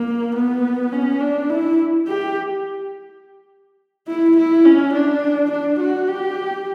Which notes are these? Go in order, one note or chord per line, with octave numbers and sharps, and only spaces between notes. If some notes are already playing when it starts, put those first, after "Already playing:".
Already playing: A#3
B3
C#4
D4
E4
G4
E4
E4
C#4
D4
D4
F#4
G4